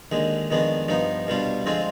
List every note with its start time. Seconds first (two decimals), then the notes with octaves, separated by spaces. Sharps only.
0.12 D#2 D3 G#3
0.51 F2 D#3 G#3 B3 D4
0.88 G2 F3 B3 D#4
1.27 C2 B2 G3 D4 F4
1.66 F2 D3 G#3 C4 F4